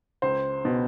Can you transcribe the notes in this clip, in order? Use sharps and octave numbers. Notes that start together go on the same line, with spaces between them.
C#2 C5
B2